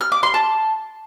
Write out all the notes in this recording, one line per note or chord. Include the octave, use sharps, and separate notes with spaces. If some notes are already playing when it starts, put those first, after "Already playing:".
F6
D6
C6
A5